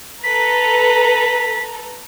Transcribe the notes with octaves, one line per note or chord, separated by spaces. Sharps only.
A4 B4 A#5 B6